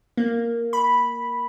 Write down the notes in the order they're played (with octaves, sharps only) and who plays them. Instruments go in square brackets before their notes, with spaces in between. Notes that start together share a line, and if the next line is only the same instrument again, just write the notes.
[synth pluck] A#3
B5